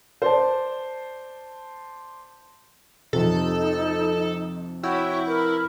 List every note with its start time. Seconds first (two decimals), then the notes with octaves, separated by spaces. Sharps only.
0.22 C5 D5 A5
3.13 F2 C3 D#4 A4
4.83 E4 F#4 C#5 G5
5.27 A#4 B4